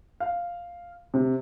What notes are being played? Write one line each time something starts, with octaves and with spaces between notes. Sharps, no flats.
F5
C3